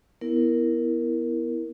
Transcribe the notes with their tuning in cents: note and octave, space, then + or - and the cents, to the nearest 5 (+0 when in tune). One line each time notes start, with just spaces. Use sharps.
B3 +0 E4 +0 A#4 +0